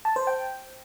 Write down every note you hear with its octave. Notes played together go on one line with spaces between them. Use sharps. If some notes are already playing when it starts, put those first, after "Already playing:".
A5
C5
G5